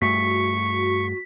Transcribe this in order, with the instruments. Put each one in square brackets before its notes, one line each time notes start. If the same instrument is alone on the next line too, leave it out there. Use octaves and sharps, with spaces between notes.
[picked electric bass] G2 A3 [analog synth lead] F#4 [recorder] C#6 [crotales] B6